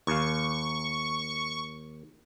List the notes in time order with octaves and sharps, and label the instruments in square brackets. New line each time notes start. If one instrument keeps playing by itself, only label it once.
[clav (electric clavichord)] D#2 F5 [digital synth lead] C#6